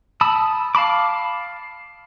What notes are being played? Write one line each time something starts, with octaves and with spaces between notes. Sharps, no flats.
A5 B5 D#6 E6
F5 A5 B5 D6